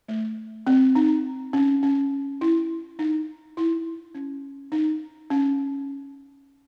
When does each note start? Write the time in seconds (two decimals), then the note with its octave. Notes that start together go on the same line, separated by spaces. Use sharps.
0.08 A3
0.67 C4
0.95 D#4
1.53 C#4
1.83 C#4
2.41 E4
2.99 D#4
3.57 E4
4.15 C#4
4.72 D#4
5.30 C#4